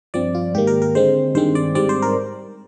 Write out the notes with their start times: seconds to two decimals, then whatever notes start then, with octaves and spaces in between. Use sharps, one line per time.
0.14 G2 F3 C4 D5
0.35 F4
0.54 G#2 D#3 A#3 G4
0.67 A#4
0.82 A#4
0.95 D3 G#3 C4 C5
1.35 G2 D#3 G#3 C4 C5
1.55 D5
1.75 G#2 G3 C4 D5
1.89 C5
2.02 A#4